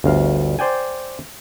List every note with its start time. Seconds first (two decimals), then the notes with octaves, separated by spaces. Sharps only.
0.04 G1 D2 F5
0.59 C5 D5 G5 G#5